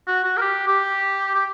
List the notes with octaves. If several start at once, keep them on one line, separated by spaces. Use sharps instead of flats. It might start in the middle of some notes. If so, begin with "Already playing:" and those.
F#4
F#4
A#4
G4
G4
G4